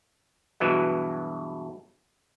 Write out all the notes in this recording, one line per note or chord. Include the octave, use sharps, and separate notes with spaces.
G2 B2 E3 F#3 G#3